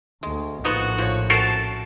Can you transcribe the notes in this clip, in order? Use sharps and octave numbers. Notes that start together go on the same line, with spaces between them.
D2 G#3
A#1 A2 F3 B3 D#4 F#4
F3 C#5
C#4 F#4 A4 A#4 C5 A5